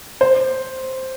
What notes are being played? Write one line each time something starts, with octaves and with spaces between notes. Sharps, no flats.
C5